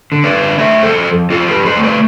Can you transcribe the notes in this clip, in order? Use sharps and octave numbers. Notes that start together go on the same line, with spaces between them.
D3
B4 D5
D3
A3 C5 E5
F2 A4 C5
F2
F2 F4 A4
G4 B4
F2
A4 C5
A3
B4 D5